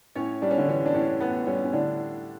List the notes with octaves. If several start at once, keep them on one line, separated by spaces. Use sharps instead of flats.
A2 C#4 C#5
G3 D4
C#4
D3 D4
E3 C#4
D4
A2 C#4
A2 B3
G3 C#4
C#4
A2 D3 D4